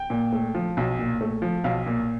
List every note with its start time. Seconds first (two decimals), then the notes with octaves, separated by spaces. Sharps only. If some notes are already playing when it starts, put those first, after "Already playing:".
Already playing: G5
0.10 A#2
0.33 A3
0.55 F3
0.77 B1
0.99 A#2
1.21 A3
1.42 F3
1.64 B1 F5
1.86 A#2